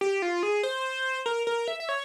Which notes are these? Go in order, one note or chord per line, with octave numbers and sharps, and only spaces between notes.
G4
F4
G#4
C5
A#4
A#4
E5
E5
C#5